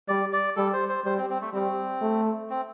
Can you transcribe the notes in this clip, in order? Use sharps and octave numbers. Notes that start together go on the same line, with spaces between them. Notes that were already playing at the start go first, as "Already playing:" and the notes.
G3 D5
D5
G3 A4
C5
C5
G3 C5
C4
C4
A3
G3 C4
A3
C4